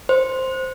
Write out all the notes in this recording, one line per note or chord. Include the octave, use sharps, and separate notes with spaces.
C5